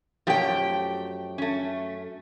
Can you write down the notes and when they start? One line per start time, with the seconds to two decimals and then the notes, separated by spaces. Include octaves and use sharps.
0.27 F#2 F3 A3 G4 G5
1.38 A3 C#4